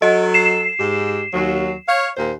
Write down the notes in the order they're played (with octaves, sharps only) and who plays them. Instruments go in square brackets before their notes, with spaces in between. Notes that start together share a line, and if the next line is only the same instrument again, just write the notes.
[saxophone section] F#3 A4 [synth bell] D#5
[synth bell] C7 E7
[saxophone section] G#2 G4
D#2 F#3
C#5 F5
D#2 A#2 C5